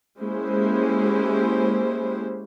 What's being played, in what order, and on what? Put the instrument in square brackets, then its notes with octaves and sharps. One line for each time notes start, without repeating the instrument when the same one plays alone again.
[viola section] G#3 A#3 C#4 E4 G4 C5